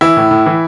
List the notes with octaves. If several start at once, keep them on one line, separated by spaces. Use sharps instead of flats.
E3 E4
A2
A2
E3